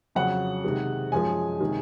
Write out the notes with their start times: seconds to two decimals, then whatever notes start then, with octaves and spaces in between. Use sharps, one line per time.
0.15 F2 C#3 F#3 F#5
0.64 C3 D#3 G#3
1.12 F#2 F3 G#3 G#5
1.60 C3 D#3 G#3